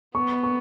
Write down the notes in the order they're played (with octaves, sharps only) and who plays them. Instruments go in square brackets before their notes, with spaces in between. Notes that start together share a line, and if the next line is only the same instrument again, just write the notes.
[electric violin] B3 [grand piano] C#6
[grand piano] C#6